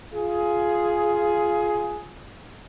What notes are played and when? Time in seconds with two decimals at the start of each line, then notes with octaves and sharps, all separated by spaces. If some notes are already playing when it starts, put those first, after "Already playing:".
0.13 F4 G#4